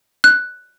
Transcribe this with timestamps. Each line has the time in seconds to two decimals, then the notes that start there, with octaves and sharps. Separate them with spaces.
0.24 F#6